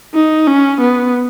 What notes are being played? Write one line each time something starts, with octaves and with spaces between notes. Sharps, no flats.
D#4
C#4
B3